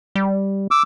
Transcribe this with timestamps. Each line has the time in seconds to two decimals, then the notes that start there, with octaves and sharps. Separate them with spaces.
0.15 G3
0.71 D6 E6